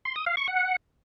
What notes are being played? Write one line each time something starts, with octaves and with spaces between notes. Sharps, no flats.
C6
D#6
F5
C#6
F#5